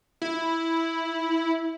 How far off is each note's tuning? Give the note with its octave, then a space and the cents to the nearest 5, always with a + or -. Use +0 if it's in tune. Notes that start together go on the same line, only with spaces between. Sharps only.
E4 -5